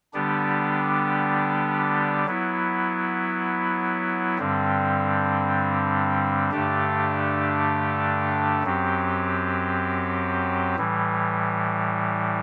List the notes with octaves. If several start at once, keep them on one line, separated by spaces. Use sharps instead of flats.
D3 G3 B3 D4 G4
F#3 B3 E4
G2 D3 G3 C4
G2 D3 A3 D4 G4
F#2 F#3 C4 G4
A2 E3 G3